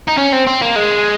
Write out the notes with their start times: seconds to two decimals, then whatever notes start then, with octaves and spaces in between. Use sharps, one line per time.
0.08 D#4
0.18 C#4
0.33 C4
0.47 C4
0.62 A#3
0.76 G#3